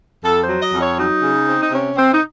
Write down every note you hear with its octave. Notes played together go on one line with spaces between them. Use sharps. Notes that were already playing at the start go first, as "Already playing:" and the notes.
F2 A4
C5
F#3
D#5
F2
C#5
F#3 D#4
C#3
C4
D#4
C3 C#4
C3 C4
D#4